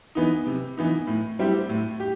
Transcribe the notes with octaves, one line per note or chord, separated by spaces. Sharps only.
E3 B3 D#4
C3
E3 B3 D#4
A2
G3 C4 E4 G4
A2
G4